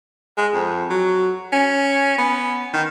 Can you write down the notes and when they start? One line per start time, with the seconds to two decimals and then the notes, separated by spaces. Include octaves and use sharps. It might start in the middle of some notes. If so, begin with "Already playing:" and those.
0.38 G#3
0.54 F2
0.90 F#3
1.52 C#4
2.18 B3
2.73 D#3